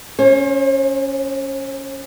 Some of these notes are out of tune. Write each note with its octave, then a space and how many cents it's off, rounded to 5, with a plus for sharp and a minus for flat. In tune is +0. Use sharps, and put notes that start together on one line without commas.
C#4 +0 C5 +45